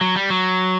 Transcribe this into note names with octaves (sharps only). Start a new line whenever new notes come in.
F#3
G3
F#3